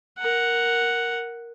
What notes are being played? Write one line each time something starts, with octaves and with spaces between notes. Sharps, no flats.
A#4 F#5